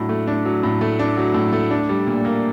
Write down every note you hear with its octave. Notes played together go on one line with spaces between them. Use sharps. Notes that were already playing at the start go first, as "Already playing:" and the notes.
Already playing: A2 F#3 D4
A3
D4
F#3
A2
A3
D4
F#3
A2
A3
D4
G3
A#2
A#3